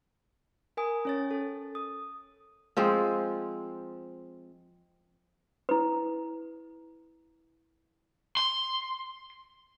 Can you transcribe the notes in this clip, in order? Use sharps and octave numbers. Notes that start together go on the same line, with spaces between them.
A#4 G#5 D#6
C#4 C#5 A6
A4
D#6
F3 G#3 C4
E4 B4
C6